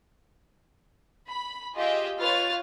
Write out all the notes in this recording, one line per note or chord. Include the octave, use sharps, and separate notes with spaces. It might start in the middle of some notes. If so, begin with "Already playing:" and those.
B5
F4 G4 G#4 D#5 E5
F4 B4 C#5 F6 A6